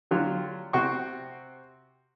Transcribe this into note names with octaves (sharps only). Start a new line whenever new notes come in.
D3 F#3 F4 G4
C3 C4 F#4 G5 C#6